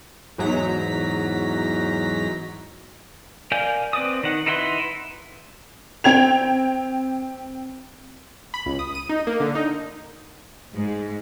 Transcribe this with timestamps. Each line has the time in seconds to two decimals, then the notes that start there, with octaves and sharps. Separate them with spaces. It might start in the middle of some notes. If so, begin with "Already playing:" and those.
0.38 E2 G#2 F#3 A#5 B6
3.52 A#4 D5 F5 G#5 G6
3.93 C4 B4 D5 D#6
4.23 D#3 F#5
4.46 D#4 E4 B4 F#5 C6
6.04 C4 G5 G#6 F7
8.54 B5
8.66 C#2
8.79 D#6
8.95 D#7
9.09 D#4
9.27 A#3
9.40 D3
9.55 D#4
10.74 G#2